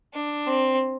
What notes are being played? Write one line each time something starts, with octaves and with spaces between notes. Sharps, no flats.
D4
C4